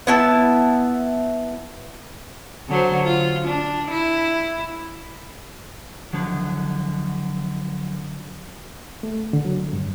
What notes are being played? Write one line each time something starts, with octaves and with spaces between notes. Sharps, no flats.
B3 E4 A5
D3 F#3 C5
F4
D4
E4
D3 F3 F#3
A3
D3
F#3
G2